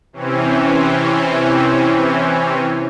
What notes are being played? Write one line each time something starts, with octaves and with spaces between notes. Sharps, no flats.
C3 E3 C4 C#4